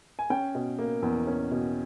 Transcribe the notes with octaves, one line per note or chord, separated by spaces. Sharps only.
G#5
C#4 G5
B2
A#3
E2
C#4
B2